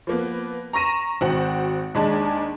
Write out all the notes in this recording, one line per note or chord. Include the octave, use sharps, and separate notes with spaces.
F3 A#3 B3
A#5 C#6 A#6 D#7 E7
G#1 F#4 C5 F#5 G5
D#2 G#3 D4 A5